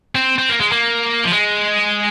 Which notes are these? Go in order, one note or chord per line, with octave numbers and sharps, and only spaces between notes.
C4
C4
A#3
G#3
A#3
F3
G#3